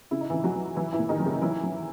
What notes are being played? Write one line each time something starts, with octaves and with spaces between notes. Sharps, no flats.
C#3 E4
D#4
C#3 E3 E4
F#3 F#4
F#3
E3 F#3 E4
E3 E4
A#2
D#3 D#4
F#3
C#3 C#4
E3 F#3 E4
F#3